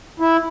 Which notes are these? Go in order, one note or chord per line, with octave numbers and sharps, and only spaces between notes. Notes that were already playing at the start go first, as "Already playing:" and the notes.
E4